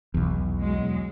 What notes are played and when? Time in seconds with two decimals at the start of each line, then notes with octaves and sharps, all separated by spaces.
0.14 B1 E2
0.60 F#3 G#3